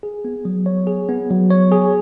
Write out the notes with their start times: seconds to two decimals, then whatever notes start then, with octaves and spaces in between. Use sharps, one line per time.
0.03 G#4
0.25 B3
0.45 F#3
0.66 C#5
0.87 G#4
1.09 B3
1.30 F#3
1.50 C#5
1.72 G#4